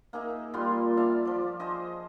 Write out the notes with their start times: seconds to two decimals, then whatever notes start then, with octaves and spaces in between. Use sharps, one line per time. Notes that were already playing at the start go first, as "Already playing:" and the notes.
0.13 A#3 D#4 G#4 E5
0.54 A#2 G3 F4 C6
0.97 D5 E5 F5 A5
1.25 F3 D5
1.60 G#4 C5 D#5